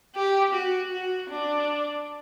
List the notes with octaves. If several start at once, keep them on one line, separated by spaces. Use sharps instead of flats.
G4
F#4
F#4
D4